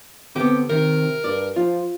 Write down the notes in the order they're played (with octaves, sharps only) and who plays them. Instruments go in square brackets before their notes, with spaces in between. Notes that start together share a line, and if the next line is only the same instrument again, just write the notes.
[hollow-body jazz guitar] D3 B3 [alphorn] C4 [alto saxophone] G4
[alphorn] C3 [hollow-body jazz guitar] D#3 [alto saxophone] A#4
[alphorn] G2 [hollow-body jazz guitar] D5
[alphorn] F3 [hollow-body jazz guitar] F4